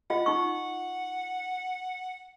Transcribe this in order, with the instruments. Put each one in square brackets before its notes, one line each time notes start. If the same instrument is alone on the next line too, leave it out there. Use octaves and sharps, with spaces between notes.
[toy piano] F4 D#5 [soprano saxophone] F#5
[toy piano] D#4 C#6